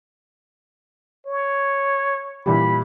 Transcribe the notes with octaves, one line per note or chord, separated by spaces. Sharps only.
C#5
A#2 E3 G3 B5